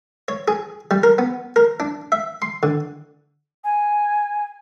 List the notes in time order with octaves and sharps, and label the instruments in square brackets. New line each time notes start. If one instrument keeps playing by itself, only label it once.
[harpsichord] C#5
G#4
G3
A#4
B3
A#4
D4
E5
C6
D3
[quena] G#5